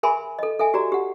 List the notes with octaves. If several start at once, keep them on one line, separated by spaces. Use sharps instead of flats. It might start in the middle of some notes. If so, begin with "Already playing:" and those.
G#4 A#4 E5 G#5 B5 C6
A4 D#5
A4 E5 G#5
F#4 G4 D5 A#5
G4 F#5